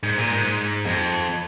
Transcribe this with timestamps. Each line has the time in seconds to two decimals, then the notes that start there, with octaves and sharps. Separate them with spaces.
0.03 G#2
0.18 A#2
0.31 G#2
0.86 F2